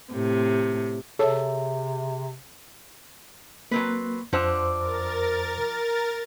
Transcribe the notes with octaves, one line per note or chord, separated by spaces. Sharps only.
A2 C3
C3 G#4 A4 C#5 E5
F#3 A#3 C4 B4
F2 F3 D4 C5 F#5 E6
A#4 A6